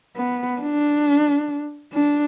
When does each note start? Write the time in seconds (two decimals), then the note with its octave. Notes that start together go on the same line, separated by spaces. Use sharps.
0.17 B3
0.61 D4
1.94 D4